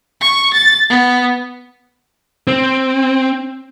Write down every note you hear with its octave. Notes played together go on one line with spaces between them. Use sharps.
C#6
A6
B3
C4